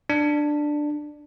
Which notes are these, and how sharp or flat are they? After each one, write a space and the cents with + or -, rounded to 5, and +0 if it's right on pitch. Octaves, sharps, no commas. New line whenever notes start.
D4 +10